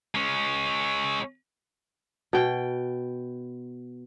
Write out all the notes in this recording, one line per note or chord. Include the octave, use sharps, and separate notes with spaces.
G#3 C#4
B2 G5